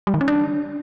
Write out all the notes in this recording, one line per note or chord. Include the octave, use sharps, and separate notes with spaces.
G3
D#3
C#4
D4